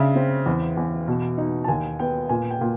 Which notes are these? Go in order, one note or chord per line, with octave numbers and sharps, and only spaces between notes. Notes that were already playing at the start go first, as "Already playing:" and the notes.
Already playing: C#3 D4 E5
C4
E2
E2
B2
D#4
A5
D#2 G#5
B3 G5
A#2 G#5
G5
A#2